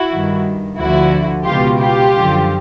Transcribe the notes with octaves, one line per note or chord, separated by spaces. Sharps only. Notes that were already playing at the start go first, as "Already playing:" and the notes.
Already playing: E4 F#4
G2 D#3
D2 D3 F3 E4 F#4
C#2 B2 F4 G4
F4 G4
F#2 D3 F3